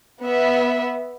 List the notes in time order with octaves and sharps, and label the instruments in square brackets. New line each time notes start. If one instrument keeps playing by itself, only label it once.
[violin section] B3 E5